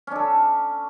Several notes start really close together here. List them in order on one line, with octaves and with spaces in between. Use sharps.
C#4 D4 A4